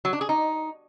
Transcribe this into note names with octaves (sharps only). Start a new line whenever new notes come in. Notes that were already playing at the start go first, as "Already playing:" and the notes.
F#3
D4
G#4
D#4